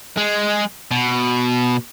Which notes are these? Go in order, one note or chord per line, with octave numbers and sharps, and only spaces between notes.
G#3
B2